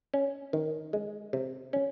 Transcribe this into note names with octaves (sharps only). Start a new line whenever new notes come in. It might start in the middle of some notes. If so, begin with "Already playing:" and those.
C#4
D#3
G#3
C3
C#4